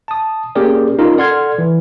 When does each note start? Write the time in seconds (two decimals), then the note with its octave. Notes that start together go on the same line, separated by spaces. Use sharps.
0.08 A5 D#6
0.55 A#3 C#4 G4 G#4 A#4 D5
0.99 C#4 D#4 F4 A#4
1.17 A4 D5 F#5 C6 F6 G#6
1.58 E3